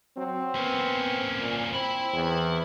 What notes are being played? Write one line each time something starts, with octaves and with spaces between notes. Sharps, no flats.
F#3 C4
A#3 B3 C#4
A#2
C4 E4 B5
E2